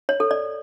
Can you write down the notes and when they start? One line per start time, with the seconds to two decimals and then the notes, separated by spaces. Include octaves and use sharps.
0.09 C#5
0.20 A4
0.31 D5